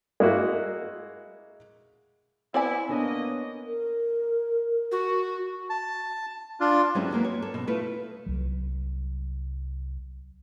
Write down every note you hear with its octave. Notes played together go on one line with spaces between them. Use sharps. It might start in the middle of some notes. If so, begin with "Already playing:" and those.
G#3 A#3 E4 F#4
B3 C4 E4 D5 G#5
A#3 B3 D4 C#5 D#5
A#4
F#4
A5
D4 F4
F#3 G#3 A3 C4 C#4 E4
F#3 G#3 A#3 B3
C#5
A4
B2
A3 E4 F4 B4
C2 F#3